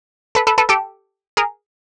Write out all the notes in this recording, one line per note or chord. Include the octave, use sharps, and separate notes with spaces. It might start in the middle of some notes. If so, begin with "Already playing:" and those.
A4 B4
A4 B4
A4 B4
G4 A4
G#4 A#4